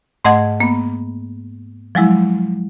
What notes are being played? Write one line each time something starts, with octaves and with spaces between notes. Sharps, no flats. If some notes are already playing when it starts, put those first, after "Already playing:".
G#2 A3 D#5 F#5 G#6
A#3 B3
F3 F#3 G#3 E4